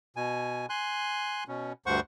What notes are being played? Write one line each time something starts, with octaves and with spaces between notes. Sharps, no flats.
B2 G#5
G#5 C6 F#6
B2 C#4
D2 G2 C5 F#5 C#6